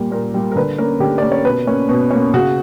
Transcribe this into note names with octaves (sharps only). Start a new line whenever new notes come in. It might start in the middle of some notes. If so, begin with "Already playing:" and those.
Already playing: A#2 G3 A#3
A#2 A#4
G3 A#3
A#4
D3 B4
A#3 C#4 A#4
D3 G4
A#3 C#4 D5
C#5
B2 B4
A#3 C#4
B2
A#3 C#4
C#3 F#4